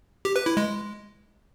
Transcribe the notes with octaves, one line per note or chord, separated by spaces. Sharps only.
G4
B4
E4
G#3